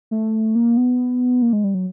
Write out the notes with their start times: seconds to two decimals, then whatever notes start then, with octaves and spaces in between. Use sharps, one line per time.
0.11 A3
0.55 A#3
0.77 B3
1.42 A#3
1.53 G#3
1.64 G3
1.75 F#3